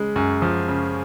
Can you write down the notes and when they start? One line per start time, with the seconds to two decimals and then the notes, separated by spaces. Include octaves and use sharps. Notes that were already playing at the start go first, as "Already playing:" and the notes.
Already playing: C#3 G#3
0.16 F#2
0.42 F3
0.68 C#3